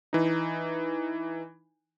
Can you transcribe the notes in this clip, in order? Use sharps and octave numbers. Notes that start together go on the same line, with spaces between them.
E3 D#4